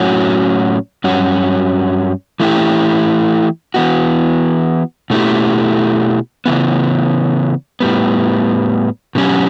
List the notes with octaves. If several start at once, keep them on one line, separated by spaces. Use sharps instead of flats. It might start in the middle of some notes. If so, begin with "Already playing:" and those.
Already playing: A2 F#3 C#4 F#4
G2 F#3 C#4 F#4
E3 A3 E4 G4
E3 B3 F#4
B2 A3 E4 G4
C#3 E3 B3
A2 G3 B3
B2 F#3 C#4 G4